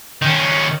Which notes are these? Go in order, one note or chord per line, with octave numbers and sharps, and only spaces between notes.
D#3 C#4